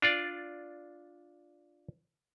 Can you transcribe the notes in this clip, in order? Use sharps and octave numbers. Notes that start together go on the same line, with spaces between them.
D4 F4 D5